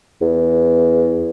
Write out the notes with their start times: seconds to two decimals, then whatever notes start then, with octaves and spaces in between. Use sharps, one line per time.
0.21 E2